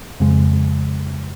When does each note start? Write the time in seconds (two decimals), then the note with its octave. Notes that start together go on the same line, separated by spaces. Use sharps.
0.20 F2 C#3 G#3